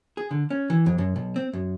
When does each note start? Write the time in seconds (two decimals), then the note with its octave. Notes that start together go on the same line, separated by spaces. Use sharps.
0.17 G#4
0.31 D3
0.50 C#4
0.70 E3
0.86 F2
0.98 F#2
1.16 B1
1.36 C4
1.53 F#2